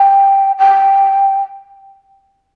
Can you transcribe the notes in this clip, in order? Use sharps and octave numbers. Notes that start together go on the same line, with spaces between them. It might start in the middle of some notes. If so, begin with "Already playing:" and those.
Already playing: G5
G5